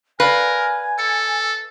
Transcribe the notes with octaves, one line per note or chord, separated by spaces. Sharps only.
A#4 B4 D5 F5 G#5
A4 C#7